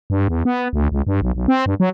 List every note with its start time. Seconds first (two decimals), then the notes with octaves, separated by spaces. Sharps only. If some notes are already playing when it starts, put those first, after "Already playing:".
0.10 G2
0.28 E2
0.45 B3
0.73 D2
0.92 C#2
1.07 G2
1.22 B1
1.35 B1
1.48 C4
1.66 G2
1.80 F#3